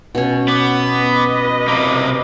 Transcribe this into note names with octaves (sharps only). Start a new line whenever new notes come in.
B2 C#4
B3 D6
B4 D#5
C3 A#3 D6